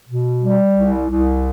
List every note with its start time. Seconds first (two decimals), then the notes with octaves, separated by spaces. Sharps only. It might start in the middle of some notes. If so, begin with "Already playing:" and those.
0.08 B2
0.42 G3
0.75 C2
1.09 C2